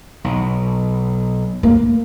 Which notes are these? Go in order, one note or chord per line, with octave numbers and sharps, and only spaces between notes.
B1
A#3